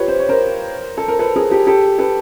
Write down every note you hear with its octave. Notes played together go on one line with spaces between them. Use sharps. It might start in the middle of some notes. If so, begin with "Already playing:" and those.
Already playing: F4 G4 B4 C#5
C5
C#5
A#4 C5
A4
A#4
A4 B4
G#4 A#4
G4 A4
G4 A4
A4 B4